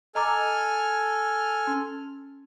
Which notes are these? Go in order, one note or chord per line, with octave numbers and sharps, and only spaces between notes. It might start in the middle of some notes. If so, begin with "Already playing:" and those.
A4 D#5 G#5 A#5 D6 F6
C#4